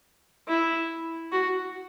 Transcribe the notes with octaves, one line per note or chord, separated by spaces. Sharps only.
E4
F#4